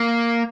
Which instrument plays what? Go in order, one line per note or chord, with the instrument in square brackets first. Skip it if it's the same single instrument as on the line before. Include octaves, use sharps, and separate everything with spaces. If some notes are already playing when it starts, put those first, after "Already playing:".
Already playing: [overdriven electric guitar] A#3